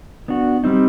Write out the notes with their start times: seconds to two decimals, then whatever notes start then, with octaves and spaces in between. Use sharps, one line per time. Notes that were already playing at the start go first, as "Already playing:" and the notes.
0.28 B3 D4 F#4
0.64 G3 C4 D#4